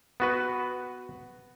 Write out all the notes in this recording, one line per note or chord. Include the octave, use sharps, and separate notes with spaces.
B3 F#4 B4